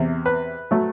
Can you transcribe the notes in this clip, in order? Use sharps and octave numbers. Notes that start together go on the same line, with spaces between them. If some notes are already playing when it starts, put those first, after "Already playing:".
Already playing: E2 C3
B4
F#3 A3